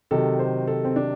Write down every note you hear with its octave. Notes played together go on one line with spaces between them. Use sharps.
C3 D#3 F#3 A4
C5
A4
C4
D4